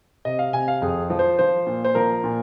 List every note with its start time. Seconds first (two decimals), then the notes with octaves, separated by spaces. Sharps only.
0.25 C3 D#5
0.39 F5
0.53 C3 G#5
0.68 F5
0.82 F2 G#4
1.10 F3
1.19 C5
1.39 F3 C5
1.67 A#2
1.84 C5
1.95 F3 A#4
2.24 A#2